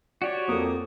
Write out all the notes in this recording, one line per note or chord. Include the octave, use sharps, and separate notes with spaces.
F#4 G4 C#5 D5
F2 A#3 A4 D#6